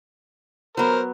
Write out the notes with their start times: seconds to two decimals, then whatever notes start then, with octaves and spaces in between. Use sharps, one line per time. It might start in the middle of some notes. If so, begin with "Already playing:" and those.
0.77 F#3 B3 A#4 C5